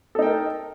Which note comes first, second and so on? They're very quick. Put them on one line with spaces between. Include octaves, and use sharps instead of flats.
A4 D#4 G5 A#4